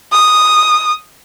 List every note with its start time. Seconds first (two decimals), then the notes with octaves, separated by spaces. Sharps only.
0.13 D#6